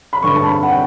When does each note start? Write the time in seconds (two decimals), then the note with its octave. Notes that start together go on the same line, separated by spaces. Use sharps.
0.13 B5
0.23 G2 D3 C#6
0.36 A5
0.47 B5
0.63 F#5
0.71 G5